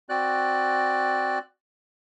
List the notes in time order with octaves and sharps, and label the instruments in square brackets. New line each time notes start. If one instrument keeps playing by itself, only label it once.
[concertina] C4 F#4 D5 F#6